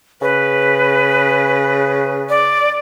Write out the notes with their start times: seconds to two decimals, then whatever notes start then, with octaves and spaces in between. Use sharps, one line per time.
0.21 C#3 B4
2.29 D5